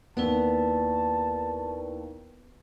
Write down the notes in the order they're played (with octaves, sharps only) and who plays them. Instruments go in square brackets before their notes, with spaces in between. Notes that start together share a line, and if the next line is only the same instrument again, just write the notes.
[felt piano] D#2 [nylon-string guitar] B3 [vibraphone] E4 B4 D5 [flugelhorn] A5